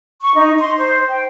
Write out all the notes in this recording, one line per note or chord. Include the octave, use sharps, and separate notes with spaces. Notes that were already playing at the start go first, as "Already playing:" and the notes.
C#6
D#4
C6
C5
G5